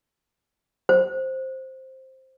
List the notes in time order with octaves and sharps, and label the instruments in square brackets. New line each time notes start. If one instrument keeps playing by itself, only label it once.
[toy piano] C5